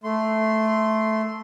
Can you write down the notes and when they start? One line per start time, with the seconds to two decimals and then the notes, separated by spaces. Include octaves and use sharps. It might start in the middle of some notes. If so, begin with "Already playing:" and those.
0.04 A3 C6